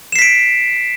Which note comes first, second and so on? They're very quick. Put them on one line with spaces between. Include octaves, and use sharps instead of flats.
E7 C7 B6 D7